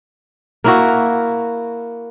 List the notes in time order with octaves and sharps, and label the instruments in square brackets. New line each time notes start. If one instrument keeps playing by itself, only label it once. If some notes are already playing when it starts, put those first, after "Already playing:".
[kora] A#3 E4 F#4